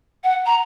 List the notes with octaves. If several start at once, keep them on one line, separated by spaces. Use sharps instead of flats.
F#5
A#5